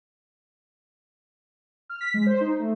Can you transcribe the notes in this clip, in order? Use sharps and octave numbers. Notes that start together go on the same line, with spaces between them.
F6
B6
G#3
C5
D#4
A3